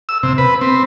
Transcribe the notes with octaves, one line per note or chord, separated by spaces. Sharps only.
E6
C3
B4
C4